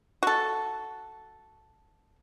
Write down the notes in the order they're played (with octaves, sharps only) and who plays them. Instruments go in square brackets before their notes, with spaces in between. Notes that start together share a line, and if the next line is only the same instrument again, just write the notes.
[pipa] F#4 A4